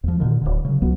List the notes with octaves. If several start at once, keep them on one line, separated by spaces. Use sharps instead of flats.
E2 F3
A#2 D3 D#3
D1 B1 D3
C#3 F#3
C#2 F#3 B3